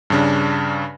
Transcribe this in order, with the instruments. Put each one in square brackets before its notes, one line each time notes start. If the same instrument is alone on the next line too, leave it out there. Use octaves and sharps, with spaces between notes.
[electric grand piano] G2 C#3 D4